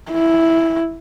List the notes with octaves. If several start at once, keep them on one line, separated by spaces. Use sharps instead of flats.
E4